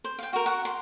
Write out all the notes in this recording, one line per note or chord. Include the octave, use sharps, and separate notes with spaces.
C5
F5 G5
F#4 A#4
F#4 F#5
C6